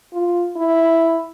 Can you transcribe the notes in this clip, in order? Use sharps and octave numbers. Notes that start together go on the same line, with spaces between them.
F4
E4